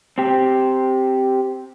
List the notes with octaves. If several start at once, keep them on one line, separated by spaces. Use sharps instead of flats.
C4 G4